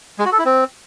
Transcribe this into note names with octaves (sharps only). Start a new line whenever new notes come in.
G#3
F#4
A4
E4
C4